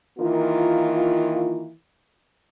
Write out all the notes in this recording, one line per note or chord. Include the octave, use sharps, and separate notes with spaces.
D#3 E3 A#3 F4